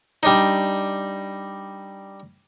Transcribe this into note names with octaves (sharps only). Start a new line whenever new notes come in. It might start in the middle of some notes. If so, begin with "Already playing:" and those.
G3 D4 D#4